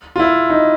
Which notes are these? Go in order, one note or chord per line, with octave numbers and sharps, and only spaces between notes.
F4
E4
D#4